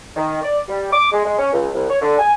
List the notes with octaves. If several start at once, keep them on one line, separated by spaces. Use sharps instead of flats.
D#3
D5
G3
D6
G#3
G#3
C#4
C#2
C2
C#5
D3
G#5